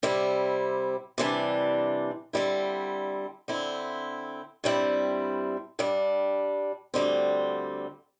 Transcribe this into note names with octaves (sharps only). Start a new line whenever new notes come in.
C3 G3 C4 E4
C3 E3 G3 D4
D3 G3 C4 E4
D3 C4 E4
G2 G3 C4 E4
G2 G3 D4
D2 D3 G3 C4